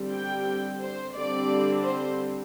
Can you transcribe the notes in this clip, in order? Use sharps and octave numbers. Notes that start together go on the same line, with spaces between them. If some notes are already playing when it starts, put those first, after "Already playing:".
Already playing: D3 G3 C4
G5
C5
D3 G3 C4 D5
C5